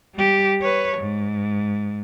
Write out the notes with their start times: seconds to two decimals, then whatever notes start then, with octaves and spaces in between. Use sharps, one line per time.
0.15 G3 G4
0.62 B4 C#5
0.97 G#2